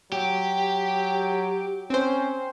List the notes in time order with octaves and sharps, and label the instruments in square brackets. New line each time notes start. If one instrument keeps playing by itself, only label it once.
[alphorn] F#3 [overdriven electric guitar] G4
[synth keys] C4 C5 [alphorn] C#4